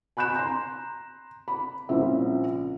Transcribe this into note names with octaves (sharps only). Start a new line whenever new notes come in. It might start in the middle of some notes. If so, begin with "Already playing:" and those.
G#5 B5 F#6 G6 E7
A#5 C6
B5
C2 A#2 C#3 F3 E5